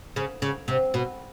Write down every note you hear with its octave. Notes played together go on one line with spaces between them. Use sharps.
C#3
C#3
C3
B2